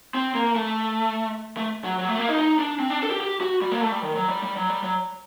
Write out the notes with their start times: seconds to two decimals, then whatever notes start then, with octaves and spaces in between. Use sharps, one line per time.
0.15 C4
0.35 A#3
0.56 A3
1.57 A3
1.84 F#3
1.99 F#3
2.09 A3
2.18 A#3
2.29 D#4
2.39 D#4
2.59 D4
2.80 C4
2.90 D4
3.03 A4
3.11 G4
3.21 G4
3.41 F#4
3.62 G3
3.71 A#3
3.81 A3
3.92 G3
4.02 D#3
4.16 F#3
4.29 G3
4.43 G3
4.57 F#3
4.69 G3
4.84 F#3